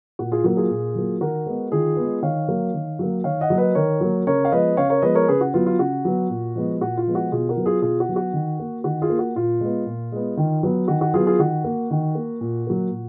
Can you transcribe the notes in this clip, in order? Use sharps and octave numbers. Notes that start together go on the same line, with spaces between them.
A#2 F#4
F4 G#4
F#3 A#3 F#4
F4 G#4
A#2
F#3 A#3
D#3 F#4 A#4
G#3 B3
D#3 F4 G#4
G#3 B3
D#3 C#5 F5
F#3 A#3
D#3
F#3 A#3
D#3 C#5 F5
D#5 F#5
F#3 A#3
B4 D#5
D#3 A#4 C#5
F#3 A#3
C#3 A#4 C#5
F5
F3 G#3 B3 B4 D#5
C#3 C#5 F5
A#4 C#5
F3 G#3 B3 B4 D#5
A#4 C#5
C#3 G#4 B4
F#4
F#3 B3 F4
F4
C#3 F#4
F#3 B3
A#2
F3 G#3 B3
A#2 F#4
F4
F3 G#3 B3
F#4
B2 F4 G#4
F#4 A#4
F#3 B3
F4 G#4
B2 F4 G#4
F#4
F#3 B3
F#4
D#3
A#3
D#3 F#4
F4 G#4
A#3
F#4
A#2 F4
G#3 B3
A#2
G#3 B3
D#3
F#3 B3
D#3 F#4
F#4
F#3 B3 F4 G#4
F4 G#4
D#3 F#4
A#3
D#3
A#3
A#2
F#3 A#3
A#2